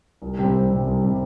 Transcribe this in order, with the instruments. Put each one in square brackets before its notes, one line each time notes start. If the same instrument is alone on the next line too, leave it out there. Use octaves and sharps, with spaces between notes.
[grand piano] C2
C3 G3 C4
C2
C3 G3 C4
C2
C3 G3 C4